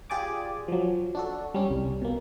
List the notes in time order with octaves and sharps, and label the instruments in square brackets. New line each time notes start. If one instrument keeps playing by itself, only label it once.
[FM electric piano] F4 G4 G#4 D5 G#5 D6
F3 F#3
D4 F#4 A4
G3 C#4
C2
B2 A#3